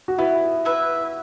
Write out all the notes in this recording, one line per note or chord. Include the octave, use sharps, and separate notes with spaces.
F#4
B3 E4
E4 B4 E5